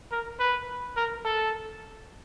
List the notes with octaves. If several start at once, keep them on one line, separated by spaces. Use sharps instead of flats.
A#4
B4
A#4
A4